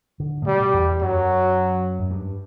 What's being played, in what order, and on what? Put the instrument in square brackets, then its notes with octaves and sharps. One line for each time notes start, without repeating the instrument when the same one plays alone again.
[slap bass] D3
A2
[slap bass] B2 [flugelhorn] G3
[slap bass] E2
[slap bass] F#2 [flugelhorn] F#3
[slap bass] F#2
G2